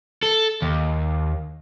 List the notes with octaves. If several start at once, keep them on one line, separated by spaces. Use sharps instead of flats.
A4
D#2